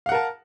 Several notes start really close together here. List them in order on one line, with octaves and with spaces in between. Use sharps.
F5 F#5 A#4 A5